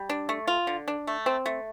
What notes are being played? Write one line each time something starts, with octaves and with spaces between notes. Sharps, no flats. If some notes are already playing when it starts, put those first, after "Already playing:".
Already playing: G3
D4
A3
F4
D3
D4
A3
C4
A3